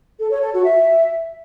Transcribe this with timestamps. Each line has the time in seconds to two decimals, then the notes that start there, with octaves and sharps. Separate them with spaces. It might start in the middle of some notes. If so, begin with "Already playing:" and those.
0.19 A4
0.30 C#5
0.41 A4
0.52 F#4
0.63 E5